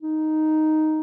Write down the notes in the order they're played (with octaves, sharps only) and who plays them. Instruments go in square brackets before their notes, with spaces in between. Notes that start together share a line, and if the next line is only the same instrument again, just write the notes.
[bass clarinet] D#4